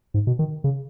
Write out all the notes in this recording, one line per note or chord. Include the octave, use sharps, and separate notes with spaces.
G#2
B2
D#3
C#3